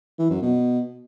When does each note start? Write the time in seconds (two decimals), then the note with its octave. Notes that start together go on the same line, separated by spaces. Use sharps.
0.19 E3
0.30 F#2
0.42 B2